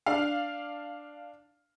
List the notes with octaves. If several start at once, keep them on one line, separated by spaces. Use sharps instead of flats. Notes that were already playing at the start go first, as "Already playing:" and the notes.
D4 F5